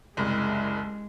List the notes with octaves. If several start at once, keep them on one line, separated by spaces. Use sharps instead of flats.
F#1 C2 G#3